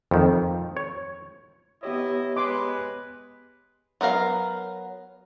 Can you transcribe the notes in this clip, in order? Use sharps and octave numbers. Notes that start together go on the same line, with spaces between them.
F2 D#3
C#5
B3 E4 G4 C#5 D#5
G#3 B4 C6 D6
F#3 B3 A#4 F5